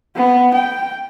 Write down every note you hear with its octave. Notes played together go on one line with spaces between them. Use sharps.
B3
G5